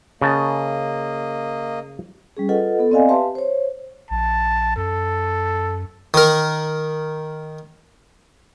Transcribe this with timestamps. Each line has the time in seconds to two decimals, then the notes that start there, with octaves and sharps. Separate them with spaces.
0.22 C#3 A#3 D#5 A5
2.37 G3 C#4 G#4
2.49 F4 A4 B4 D#5 F#5
2.79 B3 A4
2.91 C4 D5 D#5 F5 G#5
3.09 G4 B4 E5 F5 A5 C6
3.35 C5 C#5
4.11 A#1 A5
4.76 F#2 A4
6.14 D#3 A#4